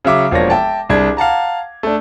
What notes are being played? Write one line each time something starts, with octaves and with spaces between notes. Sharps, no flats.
C#3 F#3 E5 D6
E1 F3 A#3 D4 C#5 A#6
E5 G5 A5
C2 D4 G#4 G#6
F5 F#5 A5 A#5
A3 D4